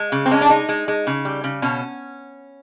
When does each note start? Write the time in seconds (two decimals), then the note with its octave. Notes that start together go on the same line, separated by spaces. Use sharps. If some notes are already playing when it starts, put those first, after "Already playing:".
Already playing: G#3
0.12 C#3
0.26 C4
0.31 G#3 C#4
0.41 D4
0.49 G#3 D#4
0.69 G#3
0.88 G#3
1.07 C#3
1.25 G3
1.44 C#3
1.62 B2 C#4